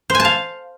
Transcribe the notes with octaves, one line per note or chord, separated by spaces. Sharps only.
C5
G#5
A5
F5